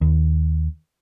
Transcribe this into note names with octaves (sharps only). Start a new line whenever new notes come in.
D#2